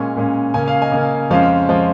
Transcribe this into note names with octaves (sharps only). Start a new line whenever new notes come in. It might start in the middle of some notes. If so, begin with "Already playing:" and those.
Already playing: A#2 G#3 C#4 G#5 C#6
A#2 G#3 C#4
C#3 A#3 C#4 G#5
F5
D#5 G#5
C#3 A#3 C#4
F2 F3 G#3 C#4 F5
F3 G#3 C#4